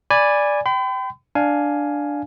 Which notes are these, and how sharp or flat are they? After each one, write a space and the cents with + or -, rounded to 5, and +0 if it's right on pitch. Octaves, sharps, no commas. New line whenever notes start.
D5 +0 G#5 -10 B5 +0
G5 -20 B5 +45
D4 +0 F5 +5 G#5 +10